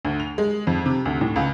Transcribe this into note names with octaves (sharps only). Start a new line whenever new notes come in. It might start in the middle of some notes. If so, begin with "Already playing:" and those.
D2
F7
G#3
F2
C3
D2
A2
C#2